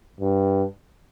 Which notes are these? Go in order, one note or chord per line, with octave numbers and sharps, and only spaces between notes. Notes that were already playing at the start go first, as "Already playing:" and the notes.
G2